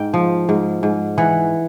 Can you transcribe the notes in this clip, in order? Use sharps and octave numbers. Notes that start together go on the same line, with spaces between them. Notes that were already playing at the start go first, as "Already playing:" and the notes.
Already playing: G#2 G5
F3
G#2
G#2
E3 F#5